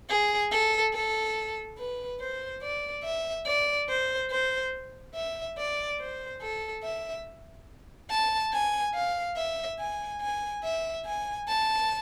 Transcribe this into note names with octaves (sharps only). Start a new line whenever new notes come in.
G#4
A4
A4
B4
C5
D5
E5
D5
C5
C5
E5
D5
C5
A4
E5
A5
G#5
F5
E5
G#5
G#5
E5
G#5
A5